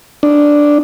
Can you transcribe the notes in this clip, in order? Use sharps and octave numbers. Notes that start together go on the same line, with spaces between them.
D4